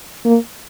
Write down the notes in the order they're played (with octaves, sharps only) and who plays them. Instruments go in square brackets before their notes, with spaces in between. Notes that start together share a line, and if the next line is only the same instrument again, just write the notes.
[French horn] A#3